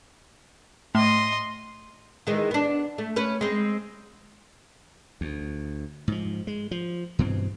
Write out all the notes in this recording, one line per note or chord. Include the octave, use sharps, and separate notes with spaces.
A2 D#5 C6
D#3 E3 G#3
B3 D4
A3
C#4 B4
G#3 C4
D2
G#2 F3
G#3
F3
G2 B2 E3 C4